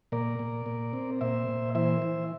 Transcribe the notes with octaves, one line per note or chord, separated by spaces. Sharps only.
A#2 A#4 D5
A#2
A#2
C4
A#2 C5 E5
A#2
E3 C5 E5
E3